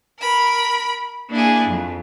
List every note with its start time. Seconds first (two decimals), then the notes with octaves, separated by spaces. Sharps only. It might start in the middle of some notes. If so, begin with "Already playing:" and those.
0.20 A#4 B5
1.30 A#3 D4 E4 G#4
1.67 F2